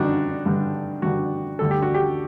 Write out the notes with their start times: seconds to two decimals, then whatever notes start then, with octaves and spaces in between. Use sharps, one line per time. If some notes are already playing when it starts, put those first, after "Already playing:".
Already playing: G2 D3 G3 D4 D#4 F#4
0.45 G2 D3 G3
1.02 G2 D3 G3 F#4
1.59 D2 D3 G3 A4
1.71 G4
1.83 F#4
1.94 G4